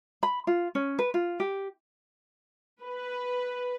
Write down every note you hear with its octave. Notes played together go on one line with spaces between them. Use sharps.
B5
F4
C#4
B4
F4
G4
B4